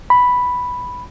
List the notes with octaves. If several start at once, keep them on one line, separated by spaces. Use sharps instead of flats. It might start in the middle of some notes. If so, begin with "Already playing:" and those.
B5